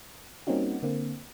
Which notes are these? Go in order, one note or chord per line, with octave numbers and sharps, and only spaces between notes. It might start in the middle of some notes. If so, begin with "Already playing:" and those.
G3 A#3 C4 C#4 D#4 F#4
D3 A#3 C4